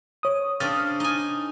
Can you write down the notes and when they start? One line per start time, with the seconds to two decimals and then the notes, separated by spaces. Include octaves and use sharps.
0.23 C#5 D#6
0.60 C#3 C4 D4 D#6 F6 A6
1.00 D#4 G#5